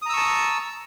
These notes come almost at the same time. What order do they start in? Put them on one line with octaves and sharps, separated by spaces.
D#6 A#5 E6 C#6 A5